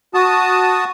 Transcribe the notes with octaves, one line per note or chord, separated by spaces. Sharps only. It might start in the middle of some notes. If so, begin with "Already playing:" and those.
F#4 A5 D#6